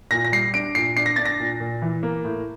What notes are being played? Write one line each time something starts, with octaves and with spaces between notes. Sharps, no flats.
A#2 A#6
A#6
G3 C7
D4 D7
A#2 C7
D4 C7
A#6
D4 A6
A#6
A#2
A#2
E3
A#3
A2